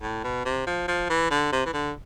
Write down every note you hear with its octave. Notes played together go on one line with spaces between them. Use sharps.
A2
B2
C3
F3
F3
E3
D3
C3
E3
D3